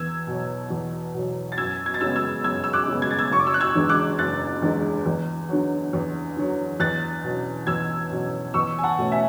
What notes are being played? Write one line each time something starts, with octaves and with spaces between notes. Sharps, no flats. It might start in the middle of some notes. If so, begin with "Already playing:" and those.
Already playing: E2 E6 G#6
B2 F#3
E2
B2 F#3
A6
F#2 E6 G#6
G#6
A6
C#3 G#3 B3 E6 G#6
E6 G#6
F#2 E6 G#6
E6
D6 F#6
C#3 G#3 B3
G#6
A6
E6 G#6
F#1 C#6
D6
E6
F#6
E6 G#6
E2 D3 G#3
D6 F#6
F#1 F#6 A6
E2 D3 G#3
E2
D3 F#3
E2
D3 F#3
E2 F#6 A6
B2 F#3 C#4
E2 E6 G#6
B2 F#3 C#4
E2 C#6 E6
G#5
F#5 A5
B2 A3 C#4
E5 G#5